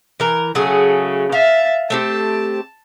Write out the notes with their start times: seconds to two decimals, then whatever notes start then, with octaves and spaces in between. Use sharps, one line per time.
0.20 E3 A#4
0.55 C#3 F#3 A3 G#4
1.32 E5 F5 A6
1.90 A3 C4 G4 A5